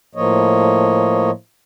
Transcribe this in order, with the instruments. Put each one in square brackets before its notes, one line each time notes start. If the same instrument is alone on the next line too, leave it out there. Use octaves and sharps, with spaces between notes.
[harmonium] A2 F3 A#3 C#5 D#5